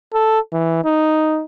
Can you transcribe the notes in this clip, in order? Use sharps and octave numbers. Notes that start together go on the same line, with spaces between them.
A4
E3
D#4